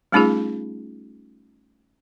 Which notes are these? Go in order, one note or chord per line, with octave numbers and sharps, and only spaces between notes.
G3 A3 C#4 D#4 F4 G#4